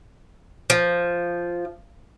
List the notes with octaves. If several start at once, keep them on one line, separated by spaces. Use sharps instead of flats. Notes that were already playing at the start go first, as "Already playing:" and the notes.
F3